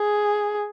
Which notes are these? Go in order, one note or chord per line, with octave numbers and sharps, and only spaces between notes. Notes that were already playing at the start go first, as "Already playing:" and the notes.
Already playing: G#4